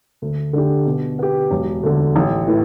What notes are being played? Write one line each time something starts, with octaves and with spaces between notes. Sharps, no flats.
D2
D3 A3 D4 G4
B2
B3 G4
E1
D2 D3
A1
A2 E3